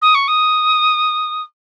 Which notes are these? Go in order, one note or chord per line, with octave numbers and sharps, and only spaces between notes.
D#6
C#6
D#6